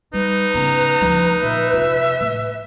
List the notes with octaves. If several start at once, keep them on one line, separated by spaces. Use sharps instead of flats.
G3 D#4 B4
C#3 B3 A#5
D2 F3
A#2 E5
F1 F4
A2